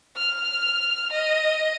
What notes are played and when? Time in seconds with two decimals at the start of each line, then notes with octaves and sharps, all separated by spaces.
0.15 F6
1.12 D#5